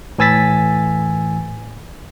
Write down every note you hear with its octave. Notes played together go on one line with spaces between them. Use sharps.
A2 E3 G#5 E6 A6 B6